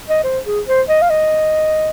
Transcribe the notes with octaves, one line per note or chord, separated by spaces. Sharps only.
D#5
C5
G#4
C5
D#5
F5
D#5